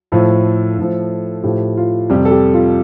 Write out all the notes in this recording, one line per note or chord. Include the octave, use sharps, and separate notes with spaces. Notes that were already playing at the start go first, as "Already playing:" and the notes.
A2 F3 A4
A2 F3
A2 F3 G4
F4
F2 C3 G3 G4
A4
G4
F4